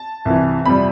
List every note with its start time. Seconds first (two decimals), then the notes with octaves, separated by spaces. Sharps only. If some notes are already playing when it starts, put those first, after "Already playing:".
Already playing: A5
0.25 C2 C3 E3
0.65 F2 C3 G3 B5